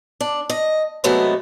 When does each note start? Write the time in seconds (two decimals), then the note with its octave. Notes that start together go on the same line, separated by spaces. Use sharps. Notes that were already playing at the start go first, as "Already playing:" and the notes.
0.21 D4
0.49 D#5
1.04 C3 F#3 G#3 A3 B3